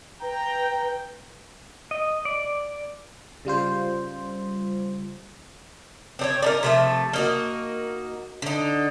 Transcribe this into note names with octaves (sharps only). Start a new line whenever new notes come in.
B4 G5 A#5
D#5
D5
C#3 G3 F4 C5
C4 D4 C#5
D4 D#4 A#4
C3 F3 A3
A#3 D#4 F#4
D3 D#4